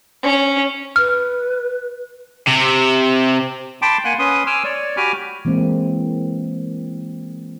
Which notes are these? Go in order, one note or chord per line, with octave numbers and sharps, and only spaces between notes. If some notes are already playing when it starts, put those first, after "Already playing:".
C#4
B4 F6
C3
G5 A5 B5 C6 D6
A#3 F#5 G#5 C6 F#6
C#4 B4 C6 D#6
G#5 C6 D6 E6 F6
C#5 D5
F#4 G4 G#5 B5 D6 F6
E3 G#3 A#3 C4